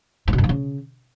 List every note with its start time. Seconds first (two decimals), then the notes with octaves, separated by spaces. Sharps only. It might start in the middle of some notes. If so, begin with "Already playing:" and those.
0.28 A2
0.33 B2
0.38 F#2
0.44 F3
0.49 C#3